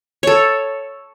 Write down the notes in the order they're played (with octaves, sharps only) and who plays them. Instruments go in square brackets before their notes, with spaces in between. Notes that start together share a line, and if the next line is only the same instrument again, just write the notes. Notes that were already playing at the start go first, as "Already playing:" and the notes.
[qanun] A4 C#5